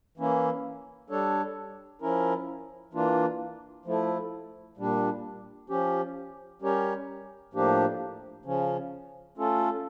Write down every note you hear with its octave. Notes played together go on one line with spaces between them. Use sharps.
E3 A#3 C#4 E4
G3 D4 A4 C#5
F3 C#4 E4 A#4
E3 A#3 D4 F4
F3 A3 E4
A#2 G3 D4
F3 C#4 G4
G3 C#4 G4 A#4 C#5
A2 F3 A#3 D4 G4
C#3 F3 C#4
A3 C#4 F4 A4